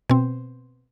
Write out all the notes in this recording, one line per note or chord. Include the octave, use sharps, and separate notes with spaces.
B2 C4